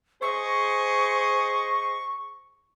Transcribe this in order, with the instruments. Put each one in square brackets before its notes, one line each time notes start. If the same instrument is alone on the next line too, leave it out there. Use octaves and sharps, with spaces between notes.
[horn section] G#4 C5 D#5 [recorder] C#6